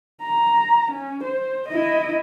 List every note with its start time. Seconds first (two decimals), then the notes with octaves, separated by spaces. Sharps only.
0.23 A#5
0.92 C#4
1.24 C5
1.69 E4 D#5